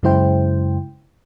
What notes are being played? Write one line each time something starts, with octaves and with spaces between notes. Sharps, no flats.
F#2 C#3 G#3 E4 C5 G5